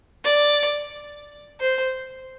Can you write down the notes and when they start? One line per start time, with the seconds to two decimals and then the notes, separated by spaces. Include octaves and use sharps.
0.24 D5
1.60 C5